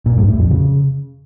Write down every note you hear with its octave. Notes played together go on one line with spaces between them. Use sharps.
A#2
G2
A2
F2
C#3